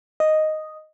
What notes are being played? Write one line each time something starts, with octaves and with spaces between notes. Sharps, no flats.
D#5